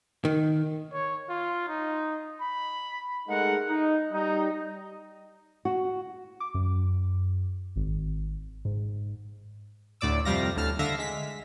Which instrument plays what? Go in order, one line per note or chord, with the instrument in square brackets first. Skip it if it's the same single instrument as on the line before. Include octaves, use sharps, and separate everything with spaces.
[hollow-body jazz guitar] D#3
[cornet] C#5
F4
D#4
B5
[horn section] G#3 A3 D#4 G#4 A#4 F#5
D#4
G3 D#4
[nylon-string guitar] F#4
[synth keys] D6
F#2
G#1
G#2
D2 A2 D5 D6 E6
F2 C3 G3 F5 A#6
D2 A2 A5 F6
D3 E5 F5 A#6
G#3 B6